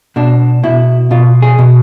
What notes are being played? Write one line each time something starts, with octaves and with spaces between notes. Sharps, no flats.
B2 D4
B2 E4
B2 F4
G#4
B2